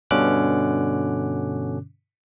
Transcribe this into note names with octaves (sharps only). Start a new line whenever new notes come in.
G2 B2 D3 C#4 D6 F#6